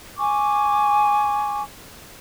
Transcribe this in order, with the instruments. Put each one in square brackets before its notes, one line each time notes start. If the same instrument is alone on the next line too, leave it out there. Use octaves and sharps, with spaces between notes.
[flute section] G#5 C#6 D6